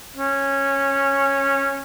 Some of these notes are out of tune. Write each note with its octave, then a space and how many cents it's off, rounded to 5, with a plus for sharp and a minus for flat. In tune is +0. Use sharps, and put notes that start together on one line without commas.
C#4 -10